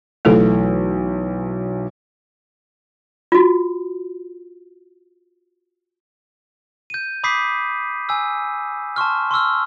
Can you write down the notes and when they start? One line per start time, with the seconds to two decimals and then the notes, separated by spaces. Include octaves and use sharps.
0.25 B1 E3 A3 F4 A4
3.32 F4 F#4
6.90 G6 D#7
7.24 B5 D6 D#6 G6 B6 C7
8.09 G#5 E6
8.96 A5 C6 C#6 F6
9.31 C6 C#6 E6 F6